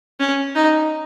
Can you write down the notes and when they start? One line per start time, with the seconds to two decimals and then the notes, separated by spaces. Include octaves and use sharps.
0.20 C#4
0.55 D#4